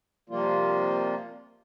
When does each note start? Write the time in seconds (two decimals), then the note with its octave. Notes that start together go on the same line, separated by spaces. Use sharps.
0.29 C3 F3 G3 A#3 F4